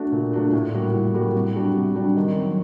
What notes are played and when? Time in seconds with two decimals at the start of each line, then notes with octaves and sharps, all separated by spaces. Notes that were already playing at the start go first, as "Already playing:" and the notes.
Already playing: A3 D4 F#4
0.12 A#2
0.33 A3 D4 F#4
0.53 A2
0.74 G3 A#3 F#4
0.94 A2
1.14 G3 A#3 F#4
1.34 C3
1.55 G3 D4 F#4
1.76 C3
1.95 G3 D4 F#4
2.17 D#3
2.37 F#3 C4